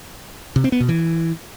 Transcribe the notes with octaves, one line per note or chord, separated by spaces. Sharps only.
C3
C4
B3
B2
E3